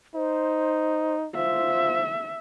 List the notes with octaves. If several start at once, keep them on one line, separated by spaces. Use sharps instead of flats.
D#4 C5
F4 C5 E5